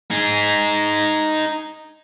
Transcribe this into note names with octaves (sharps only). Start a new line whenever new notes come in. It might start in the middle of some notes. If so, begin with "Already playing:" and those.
D#4 G#4